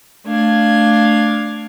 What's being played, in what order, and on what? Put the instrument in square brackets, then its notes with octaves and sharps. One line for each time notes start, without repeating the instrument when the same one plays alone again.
[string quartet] A3 D4 F5 G#6